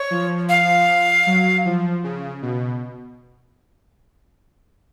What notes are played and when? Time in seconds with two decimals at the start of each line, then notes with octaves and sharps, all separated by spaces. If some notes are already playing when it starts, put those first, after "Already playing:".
Already playing: C#5
0.11 F3
0.49 F5
1.27 F#3
1.65 F3
2.04 C#3
2.42 B2